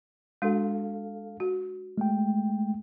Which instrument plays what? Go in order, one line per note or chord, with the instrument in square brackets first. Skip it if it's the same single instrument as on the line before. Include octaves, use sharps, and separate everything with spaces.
[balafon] G#3 D4 F#4 [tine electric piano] A4 F5
[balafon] F#4
[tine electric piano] G#3 A3 G5